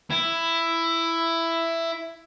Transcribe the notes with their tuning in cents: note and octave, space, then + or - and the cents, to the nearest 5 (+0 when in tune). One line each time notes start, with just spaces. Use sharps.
E4 +10